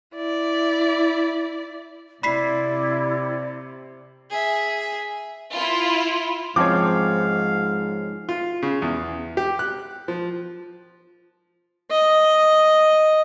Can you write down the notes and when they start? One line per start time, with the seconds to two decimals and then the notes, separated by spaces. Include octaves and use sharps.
0.14 E4 D5
2.23 C3 E4 D5 B5 B6 C7
4.30 G#4 E5
5.52 E4 F4
6.56 G#2 F3 C4 C#4 C#5 F5 A5 D6
8.29 F4
8.62 C#3
8.82 E2
9.37 G4
9.59 F#6
10.08 F3
11.91 D#5